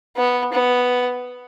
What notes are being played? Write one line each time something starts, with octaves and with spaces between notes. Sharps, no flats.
B3
B3